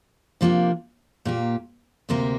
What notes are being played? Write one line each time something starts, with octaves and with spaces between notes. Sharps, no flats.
C3 F3 A#3 D4
A#2 A#3 G4
D2 C3 A#3 G4 A#4